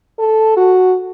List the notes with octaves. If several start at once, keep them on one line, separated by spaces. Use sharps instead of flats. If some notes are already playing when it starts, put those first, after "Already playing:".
A4
F#4